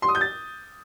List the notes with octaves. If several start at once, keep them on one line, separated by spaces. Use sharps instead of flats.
C6
D#6
G6
A6